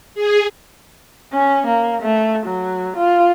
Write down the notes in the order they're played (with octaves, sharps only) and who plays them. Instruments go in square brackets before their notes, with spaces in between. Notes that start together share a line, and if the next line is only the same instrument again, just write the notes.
[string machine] G#4
[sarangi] C#4
A#3
A3
F#3
F4